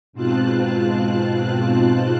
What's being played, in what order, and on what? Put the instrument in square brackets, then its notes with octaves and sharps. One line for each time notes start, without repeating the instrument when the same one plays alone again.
[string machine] G#2 B2 C4 F4 A5 F#6